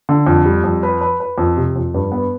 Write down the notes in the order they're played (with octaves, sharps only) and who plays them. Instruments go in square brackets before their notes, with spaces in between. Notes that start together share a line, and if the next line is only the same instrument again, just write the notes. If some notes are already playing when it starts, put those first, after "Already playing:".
[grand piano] D3
F2
G3
F2
B4
B4
B4
F2
C3
F2
G2
B3